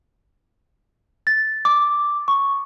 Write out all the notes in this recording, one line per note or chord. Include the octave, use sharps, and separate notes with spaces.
A6
D6
C#6